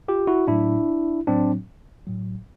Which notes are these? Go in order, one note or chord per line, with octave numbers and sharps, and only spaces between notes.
F4 G4
E4 F#4
A2 F#3 D4 E4
A2 F#3 C4 D4
A2 F#3